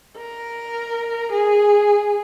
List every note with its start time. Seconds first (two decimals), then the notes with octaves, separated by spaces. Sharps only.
0.17 A#4
1.32 G#4